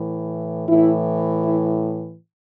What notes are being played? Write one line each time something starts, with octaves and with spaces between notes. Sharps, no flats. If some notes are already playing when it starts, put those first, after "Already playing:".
Already playing: A2 E3
A2 E3 E4
E4